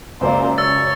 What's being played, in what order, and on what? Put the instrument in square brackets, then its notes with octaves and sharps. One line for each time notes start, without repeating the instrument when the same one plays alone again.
[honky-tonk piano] C#2 F#2 D5 [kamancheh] A#3 C5
[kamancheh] C#5 [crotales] E6 A6